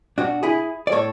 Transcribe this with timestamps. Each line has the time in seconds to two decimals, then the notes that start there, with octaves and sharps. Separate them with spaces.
0.18 B2 D4 F#4
0.43 E4 G#4
0.87 D5
0.92 A2 A4 C#5